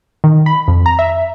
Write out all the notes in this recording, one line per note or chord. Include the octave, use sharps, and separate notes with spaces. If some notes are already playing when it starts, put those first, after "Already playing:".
D#3
B5
F2
A#5
E5